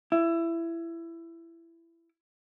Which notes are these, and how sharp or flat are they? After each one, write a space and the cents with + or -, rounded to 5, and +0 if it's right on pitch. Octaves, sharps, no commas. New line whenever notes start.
E4 +20